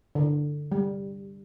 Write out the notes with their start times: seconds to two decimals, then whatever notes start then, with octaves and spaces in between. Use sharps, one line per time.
0.15 D3
0.72 G3